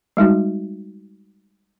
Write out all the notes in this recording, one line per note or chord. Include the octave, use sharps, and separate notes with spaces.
G3 G#3 D#4 F#4